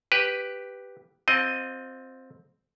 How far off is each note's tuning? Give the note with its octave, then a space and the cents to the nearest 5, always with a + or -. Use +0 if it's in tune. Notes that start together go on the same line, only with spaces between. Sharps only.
G4 +0 B4 +0
C4 +0 F4 +30 D#5 +0